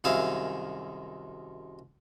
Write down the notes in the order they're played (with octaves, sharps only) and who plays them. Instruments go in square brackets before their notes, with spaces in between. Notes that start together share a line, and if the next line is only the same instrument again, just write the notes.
[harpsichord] C2 F#2 D#3 G#4 E5 F5